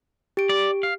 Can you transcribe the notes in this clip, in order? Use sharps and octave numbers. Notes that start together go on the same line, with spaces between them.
G4 D7
D5
F5